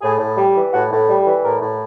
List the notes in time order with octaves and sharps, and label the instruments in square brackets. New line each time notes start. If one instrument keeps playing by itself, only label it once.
[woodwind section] A2 G#4
A2
G3 G4
E3
A2 F#4
A2
G3
E3
A2 A#4
A2